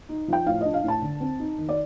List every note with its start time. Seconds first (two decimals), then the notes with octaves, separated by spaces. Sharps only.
0.09 D#4
0.28 F3 G5
0.47 A2 F5
0.61 D4 D#5
0.74 F5
0.84 A2 A5
1.02 D3
1.20 C4
1.39 D#4
1.58 D#3
1.69 D5